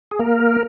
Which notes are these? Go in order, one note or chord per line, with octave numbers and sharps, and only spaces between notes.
G#4
A#3 A#4